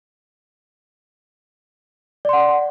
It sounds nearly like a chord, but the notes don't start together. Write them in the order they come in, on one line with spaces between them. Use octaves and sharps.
D5 C6 F#5